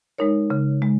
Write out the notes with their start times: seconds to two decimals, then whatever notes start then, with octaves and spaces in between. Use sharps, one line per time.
0.18 G#3 D#4 A#4 C#5
0.50 C#3
0.82 G#3